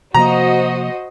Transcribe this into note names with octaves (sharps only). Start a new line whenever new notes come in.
C3 F3 A#3 F#4 C5 D#5 A#5